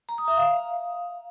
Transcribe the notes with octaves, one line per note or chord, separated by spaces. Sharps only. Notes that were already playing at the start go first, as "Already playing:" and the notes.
A#5
D#6
E5
F5